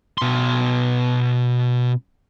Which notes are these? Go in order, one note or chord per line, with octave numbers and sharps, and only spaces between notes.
B2 C6